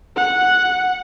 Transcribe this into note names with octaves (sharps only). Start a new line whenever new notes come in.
F#5